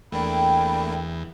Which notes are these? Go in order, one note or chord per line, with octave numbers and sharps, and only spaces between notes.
E2 A3 A#3 D4 G5 B5